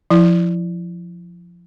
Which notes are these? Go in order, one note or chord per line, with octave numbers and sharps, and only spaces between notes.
F3 E4